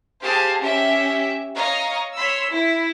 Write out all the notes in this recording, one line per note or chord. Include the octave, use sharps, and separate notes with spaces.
G4 G#4 C5 F5 A5
C#4 G4 E5
C#5 D#5 F5 A#5
C#5 B5 C6 E6
E4